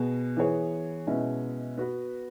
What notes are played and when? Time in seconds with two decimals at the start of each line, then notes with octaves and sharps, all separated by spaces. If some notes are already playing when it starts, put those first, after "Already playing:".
Already playing: B2 B3 G#4
0.37 E3 B3 G#4 C#5
1.07 B2 G#3 C#4 E4
1.78 B3 F#4 B4